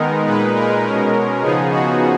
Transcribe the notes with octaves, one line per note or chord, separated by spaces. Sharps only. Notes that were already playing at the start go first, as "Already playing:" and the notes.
Already playing: D#3 G#3 B3 D#4 A#4
A#2 G#3 D#4 B4
A#4
B2 G#3 C#4
C#3 F3 B3 D#4 G#4
F#4